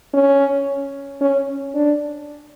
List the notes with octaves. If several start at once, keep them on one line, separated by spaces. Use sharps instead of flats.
C#4
C#4
D4